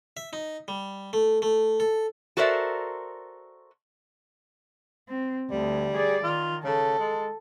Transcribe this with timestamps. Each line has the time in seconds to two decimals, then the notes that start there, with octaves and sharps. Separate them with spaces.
0.17 E5
0.33 D#4
0.68 G3
1.13 A3
1.42 A3
1.80 A4
2.37 F#4 A4 A#4 C5 D5 E5
5.09 C4
5.51 D2 G3
5.95 G#4 D5
6.24 D#3 F4
6.64 C#3 A4
6.99 G#3